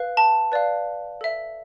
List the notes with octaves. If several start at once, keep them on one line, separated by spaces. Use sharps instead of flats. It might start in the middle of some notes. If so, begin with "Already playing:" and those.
Already playing: B4 F5
A5
B4 D5 F5
A4 E5